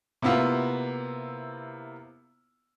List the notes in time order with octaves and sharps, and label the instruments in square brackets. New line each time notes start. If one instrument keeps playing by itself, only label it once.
[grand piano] C3 A#3 B3 E4 F4